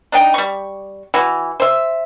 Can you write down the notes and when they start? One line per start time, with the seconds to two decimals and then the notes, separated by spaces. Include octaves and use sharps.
0.12 D4 D#4 G5
0.34 G3 C#6
1.14 E3 F#4
1.60 C5 E5